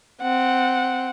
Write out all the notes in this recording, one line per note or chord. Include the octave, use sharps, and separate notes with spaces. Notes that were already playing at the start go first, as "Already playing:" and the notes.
C4 F#5